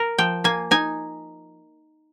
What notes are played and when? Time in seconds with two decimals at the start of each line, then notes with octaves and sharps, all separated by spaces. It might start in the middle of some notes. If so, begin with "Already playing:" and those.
Already playing: A#4
0.18 F3 G5
0.44 A#3 G#5
0.71 D#4 G#5